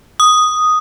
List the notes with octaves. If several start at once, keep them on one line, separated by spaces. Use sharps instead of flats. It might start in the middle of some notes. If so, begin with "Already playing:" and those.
D#6